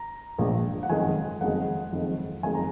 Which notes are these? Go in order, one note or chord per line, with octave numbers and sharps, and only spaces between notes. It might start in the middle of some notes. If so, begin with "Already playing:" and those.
Already playing: A#5
A#1 A#2 G#3 D4
F#5
F#1 F2 D#3 G#3 G#5
F#1 F2 D#3 G#3 F#5
F#1 F2 D#3 G#3
F#1 F2 D#3 G#3 G#5
A#5